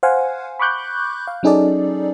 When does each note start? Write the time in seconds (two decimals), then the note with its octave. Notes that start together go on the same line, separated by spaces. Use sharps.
0.03 C5 F5 F#5 G#5
0.59 B5 C#6 D6 F#6 G6
1.27 F5
1.43 F#3 C#4 D#4 G#4 A4 D5